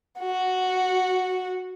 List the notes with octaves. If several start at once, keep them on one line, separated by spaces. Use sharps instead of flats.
F#4